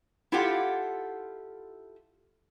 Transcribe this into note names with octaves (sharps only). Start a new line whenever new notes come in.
E4 F4 G4 A4 F5 F#5